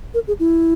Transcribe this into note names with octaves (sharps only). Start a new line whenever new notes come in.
A#4
G#4
E4